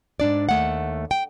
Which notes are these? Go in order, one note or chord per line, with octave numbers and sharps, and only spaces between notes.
G#2 D4 D5
D#2 A3 F#5
G5